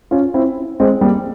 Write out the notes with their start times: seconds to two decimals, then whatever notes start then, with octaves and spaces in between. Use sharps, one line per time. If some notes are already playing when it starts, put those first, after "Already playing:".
0.11 C#4 F4
0.34 C4 E4
0.80 G#3 C4
1.01 G3 A#3